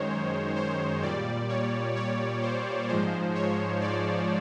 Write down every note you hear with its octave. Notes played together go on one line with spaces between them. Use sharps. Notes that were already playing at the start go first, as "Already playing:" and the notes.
Already playing: F#2 D#3 G#3 C5 C#5
C5
A#2 G3 D5
C#5
C#5
C5
G#2 F3 G#3 C5
C#5
D5